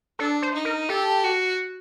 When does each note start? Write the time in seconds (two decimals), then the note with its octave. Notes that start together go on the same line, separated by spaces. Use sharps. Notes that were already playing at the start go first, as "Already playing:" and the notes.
0.19 D4 A4
0.42 C5
0.54 D#4
0.65 A#4
0.89 G4 A4
1.24 F#4